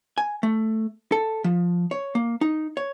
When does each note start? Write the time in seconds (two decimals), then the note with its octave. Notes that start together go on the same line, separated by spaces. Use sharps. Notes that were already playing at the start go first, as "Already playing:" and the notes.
0.18 G#5
0.43 A3
1.12 A4
1.44 F3
1.91 C#5
2.15 A#3
2.41 D#4
2.77 C#5